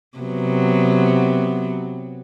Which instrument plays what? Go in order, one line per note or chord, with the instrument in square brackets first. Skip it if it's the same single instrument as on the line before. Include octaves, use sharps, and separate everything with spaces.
[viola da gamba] C3 F#3 B3